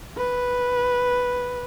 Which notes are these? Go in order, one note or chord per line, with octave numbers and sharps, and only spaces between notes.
B4